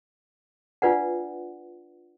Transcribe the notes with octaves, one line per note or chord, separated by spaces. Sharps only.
D4 F4 B4 D5 F#5